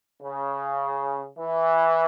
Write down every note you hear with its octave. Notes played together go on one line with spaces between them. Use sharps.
C#3
E3